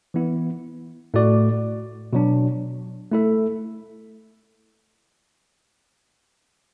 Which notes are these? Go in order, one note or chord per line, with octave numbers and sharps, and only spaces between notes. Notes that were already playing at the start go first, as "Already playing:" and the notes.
E3 B3 E4
A2 A3 F#4 D5
B2 F#3 D4
A3 E4 A4 E5